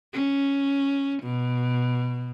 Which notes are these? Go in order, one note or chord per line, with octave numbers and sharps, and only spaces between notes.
C#4
B2